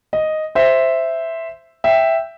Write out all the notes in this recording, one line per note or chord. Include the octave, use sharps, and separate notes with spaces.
D#5
C5 E5
E5 G5